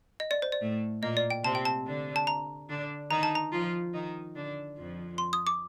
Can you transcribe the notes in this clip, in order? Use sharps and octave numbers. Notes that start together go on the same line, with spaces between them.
D#5
D5
C5
D5
A2 A3
A#2 A#3 D#5
D5
G5
C3 C4 A5
G5
A5
D3 D4
A5
A#5
D3 D4
D#3 D#4 A#5
A5
A#5
F3 F4
D#3 D#4
D3 D4
F2 F3
C6
D#6
D6